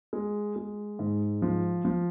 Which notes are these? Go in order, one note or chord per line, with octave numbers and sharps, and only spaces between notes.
G#3
G#3
G#2
F3
F3